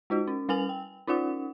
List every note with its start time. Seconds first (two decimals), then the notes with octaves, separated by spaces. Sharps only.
0.10 G#3 D#4 F#4
0.27 C#4
0.49 G3 C#4 B4 G#5 F7 F#7
0.69 G5
1.07 C#4 D#4 F4 F#5